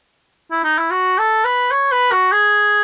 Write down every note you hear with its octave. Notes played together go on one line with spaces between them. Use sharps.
E4
D#4
E4
F#4
A4
B4
C#5
B4
F#4
G#4